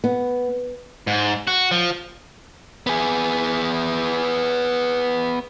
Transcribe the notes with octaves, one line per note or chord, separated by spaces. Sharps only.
B3
G#2
F#4
F3
B3 G#4